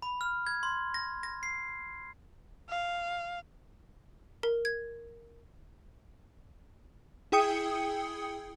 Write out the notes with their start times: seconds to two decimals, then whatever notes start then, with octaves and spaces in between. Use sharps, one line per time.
0.02 B5
0.21 F6
0.47 G#6
0.63 C6
0.94 A#6
1.23 A#6
1.43 C7
2.69 F5
4.43 A#4
4.65 G#6
7.32 E4 G#4 G5 D#6 C#7